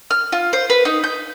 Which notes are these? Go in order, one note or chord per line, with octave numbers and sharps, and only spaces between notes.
F6
F4
C5
B4
D#4
G6